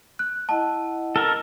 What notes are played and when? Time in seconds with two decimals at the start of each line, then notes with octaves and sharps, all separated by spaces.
0.19 F#6
0.49 E4 D#5 F#5 A5
1.16 A4 A#4